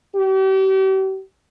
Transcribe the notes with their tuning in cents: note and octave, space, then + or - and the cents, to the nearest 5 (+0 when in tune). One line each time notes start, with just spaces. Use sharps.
G4 -40